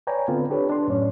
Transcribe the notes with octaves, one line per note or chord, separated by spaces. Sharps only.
B4 C#5 D5 G5 G#5 A#5
D3 B3 C4 F4 A4 B4
D4 G4 A4 B4 C#5
D4 C6
F#2 A2 C#4 C#5 D5